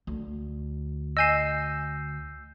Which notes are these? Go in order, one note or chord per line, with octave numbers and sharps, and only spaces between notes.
D2
D#5 G#5 E6 G6 C7 E7